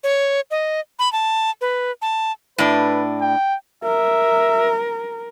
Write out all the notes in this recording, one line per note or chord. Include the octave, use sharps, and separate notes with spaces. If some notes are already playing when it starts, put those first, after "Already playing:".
C#5
D#5
B5
A5
B4
A5
A2 D4 B4
G5
A#4 E5